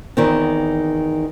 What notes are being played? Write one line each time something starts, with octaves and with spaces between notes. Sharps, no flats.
E2 D#3 C4